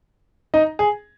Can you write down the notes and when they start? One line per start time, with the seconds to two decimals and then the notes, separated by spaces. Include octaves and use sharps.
0.54 D#4 D#5
0.79 G#4